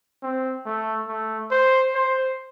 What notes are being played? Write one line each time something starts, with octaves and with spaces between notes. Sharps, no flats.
C4
A3
A3
C5
C5